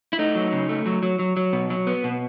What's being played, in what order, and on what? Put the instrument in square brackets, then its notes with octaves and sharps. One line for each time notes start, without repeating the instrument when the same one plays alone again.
[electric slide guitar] E4
A3 D#4
F#3
C#3
A3
F#3
F#3
F#3
F#3
B2
F#3
B3
B2